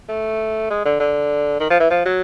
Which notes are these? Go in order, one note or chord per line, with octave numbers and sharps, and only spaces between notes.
A3
G#3
D3
D3
D#3
F3
E3
F3
F#3